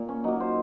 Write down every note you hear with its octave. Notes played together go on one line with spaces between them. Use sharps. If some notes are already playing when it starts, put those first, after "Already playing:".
Already playing: A#2 A#3
C#4
F#3 A#3 D#4
C5